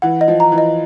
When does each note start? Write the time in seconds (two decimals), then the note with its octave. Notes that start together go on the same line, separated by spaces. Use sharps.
0.02 E3 F#5
0.21 D#5
0.28 F3
0.40 A#5
0.52 E3
0.58 D#5